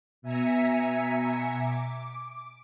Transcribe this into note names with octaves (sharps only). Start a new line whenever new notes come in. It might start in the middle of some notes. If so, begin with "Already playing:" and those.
B2 E5 G#5 A#5 B6 C#7
D6